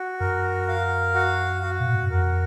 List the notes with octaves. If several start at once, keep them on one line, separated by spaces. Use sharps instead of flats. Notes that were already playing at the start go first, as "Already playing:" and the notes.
Already playing: F#4
F#2 A#4
F5
F#4
F#4
B2
A#2
G#2
F#2
F2 A#4